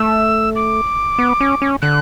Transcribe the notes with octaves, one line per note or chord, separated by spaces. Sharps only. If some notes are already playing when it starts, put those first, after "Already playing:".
Already playing: A3 E6
D6
B3
C#4
C#4
D3 F#6